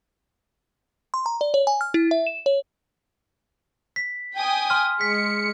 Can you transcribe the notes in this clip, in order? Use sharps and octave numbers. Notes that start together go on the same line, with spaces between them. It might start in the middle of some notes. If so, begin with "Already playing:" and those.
C6
A#5
D5
C#5
G#5
F6
E4
E5
E7
C#5
B6
G5 G#5 D#6
C6 F6
G#3 B6 C#7